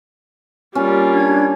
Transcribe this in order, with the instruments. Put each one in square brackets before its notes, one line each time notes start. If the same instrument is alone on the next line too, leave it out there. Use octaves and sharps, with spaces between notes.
[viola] G3 [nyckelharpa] A#3 F4 [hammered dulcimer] C#4
[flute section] D4 G#6